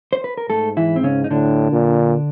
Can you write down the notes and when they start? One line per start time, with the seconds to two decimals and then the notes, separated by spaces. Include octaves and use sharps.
0.13 C5
0.24 B4
0.37 A#4
0.49 G#2 A3 A4
0.77 E3 E4
0.96 C4
1.04 C#3 C#4
1.24 D#4
1.30 A2 D3 D4
1.72 A#2